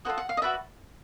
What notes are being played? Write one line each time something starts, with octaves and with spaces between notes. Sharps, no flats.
F4 A4 C5 D#5 F#5
F#5
F5
D#5
F#4 B4 D5 E5